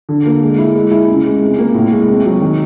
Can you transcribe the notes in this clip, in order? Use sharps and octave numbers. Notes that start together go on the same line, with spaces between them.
D3
A#3
G#3
E4
G#3
E4
C#3
G#3
C3
A#3
A2
G#3
C3
F#3
D#3